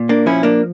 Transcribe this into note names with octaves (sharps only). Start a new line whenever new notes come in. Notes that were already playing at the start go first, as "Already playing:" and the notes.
Already playing: A#2
A#3 D4
F3 C#4 E4
A#3 D4